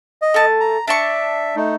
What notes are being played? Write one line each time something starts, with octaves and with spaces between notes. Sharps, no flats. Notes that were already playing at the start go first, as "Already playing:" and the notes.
D#5
A3 A5
A#5
D4 E5 A5 C#6
A3 D#4